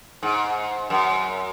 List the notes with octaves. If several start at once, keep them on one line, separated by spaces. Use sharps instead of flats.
G#2
F#2